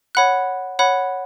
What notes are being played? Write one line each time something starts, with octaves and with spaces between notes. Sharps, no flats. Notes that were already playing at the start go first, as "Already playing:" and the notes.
C#5 F#5 B5 F#6
C#5 F#5 B5 F#6